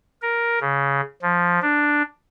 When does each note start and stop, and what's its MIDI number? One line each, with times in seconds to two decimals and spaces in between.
0.22 0.59 70
0.61 1.01 49
1.22 1.59 53
1.62 2.03 62